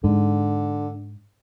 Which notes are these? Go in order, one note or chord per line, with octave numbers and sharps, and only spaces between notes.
G#2 D3